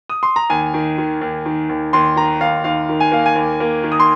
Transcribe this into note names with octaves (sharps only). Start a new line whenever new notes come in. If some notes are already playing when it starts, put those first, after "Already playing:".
D#6
C6
A#5
D#2 G#5
D#3
D#3
D#2
D#3
D#2
D#2 C6
D#3 A#5
D#2 F5
D#2 F5
D#3
G#5
A#3 F5
G#5
D#2
A#3
D#3
D#6
C6